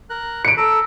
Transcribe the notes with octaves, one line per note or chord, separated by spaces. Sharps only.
A#4 F#6
C#7 D7
A4 A#5 E6